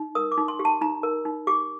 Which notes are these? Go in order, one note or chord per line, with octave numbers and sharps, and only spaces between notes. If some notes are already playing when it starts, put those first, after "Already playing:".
Already playing: D#4
A#4 D#6
D6
D#4
C6
G4
A5
D#4 A#5
A#4
D#4
G4 D6